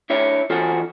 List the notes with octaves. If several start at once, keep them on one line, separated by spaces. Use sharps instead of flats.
D4 E4 C#5 E5
E3 F4 F#4 G#4 A4 C5